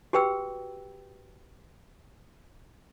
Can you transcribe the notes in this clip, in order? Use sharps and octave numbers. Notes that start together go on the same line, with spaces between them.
F#4 G4 B4 G5 E6